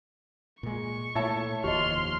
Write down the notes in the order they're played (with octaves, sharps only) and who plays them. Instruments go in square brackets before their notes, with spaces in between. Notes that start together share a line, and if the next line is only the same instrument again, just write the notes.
[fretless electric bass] A#2 G#3 [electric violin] C#6
[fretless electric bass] A#2 A3 [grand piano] E4 C#5 A5
[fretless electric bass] F1 D#2 F3 [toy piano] G4 D#5 [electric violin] C6 F6